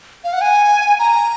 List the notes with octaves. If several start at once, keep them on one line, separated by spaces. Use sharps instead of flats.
F5
F#5
G#5
A#5